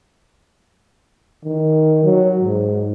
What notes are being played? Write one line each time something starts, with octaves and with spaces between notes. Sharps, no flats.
D#3
F#3
G#2